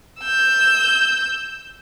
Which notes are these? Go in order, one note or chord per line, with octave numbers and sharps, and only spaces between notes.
E6 G6